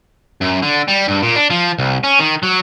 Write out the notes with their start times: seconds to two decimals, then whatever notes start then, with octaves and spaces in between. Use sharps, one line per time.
0.41 F#2
0.62 D3
0.88 G3
1.08 G2
1.22 A#2
1.36 D4
1.50 F3
1.79 C2
2.04 C#4
2.19 D#3
2.43 F#3